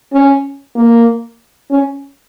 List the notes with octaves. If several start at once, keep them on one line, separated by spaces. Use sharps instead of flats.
C#4
A#3
C#4